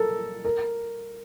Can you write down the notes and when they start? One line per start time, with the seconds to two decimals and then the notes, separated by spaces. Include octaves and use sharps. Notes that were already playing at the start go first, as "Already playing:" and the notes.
Already playing: A4 A#4
0.45 A#4